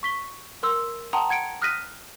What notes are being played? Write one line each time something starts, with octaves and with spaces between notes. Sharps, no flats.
C#6 B6 G7
A#4 C6 E6
F#5 G5 A5 A#5 C6 D#6
F#5 G#6 C#7 D7
D#6 F6 F#6 A#6 B6 D#7